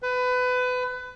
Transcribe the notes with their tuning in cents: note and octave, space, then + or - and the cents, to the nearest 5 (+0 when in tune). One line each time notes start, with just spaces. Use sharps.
B4 +25